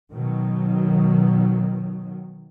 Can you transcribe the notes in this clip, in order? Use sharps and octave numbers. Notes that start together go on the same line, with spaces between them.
B2 D#3 F#3